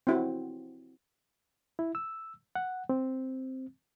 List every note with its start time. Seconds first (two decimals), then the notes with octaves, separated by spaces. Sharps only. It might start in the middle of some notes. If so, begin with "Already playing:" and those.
0.07 C4 E4 F#4
1.79 E4
1.95 E6
2.55 F#5
2.89 C4